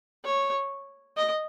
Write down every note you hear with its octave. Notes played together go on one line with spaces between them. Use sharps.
C#5
D#5